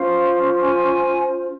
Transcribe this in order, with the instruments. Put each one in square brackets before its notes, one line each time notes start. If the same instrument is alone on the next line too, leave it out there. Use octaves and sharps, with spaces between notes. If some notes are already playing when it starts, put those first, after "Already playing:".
Already playing: [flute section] C#4 F4 C5 F5
G#5